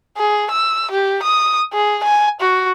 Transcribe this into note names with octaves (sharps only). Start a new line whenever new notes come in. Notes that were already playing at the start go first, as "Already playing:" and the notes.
G#4
E6
G4
D#6
G#4
G#5
F#4